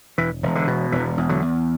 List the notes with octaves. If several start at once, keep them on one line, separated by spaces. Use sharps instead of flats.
E1 E3
E1
D3
B2
E1 E3
E2
D3 F#3
E2